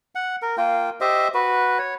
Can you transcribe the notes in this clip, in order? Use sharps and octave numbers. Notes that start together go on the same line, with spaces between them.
F#5
A#4
A#3 F4 G5
G4 C5 D#5 E5
F#4 B4
C#5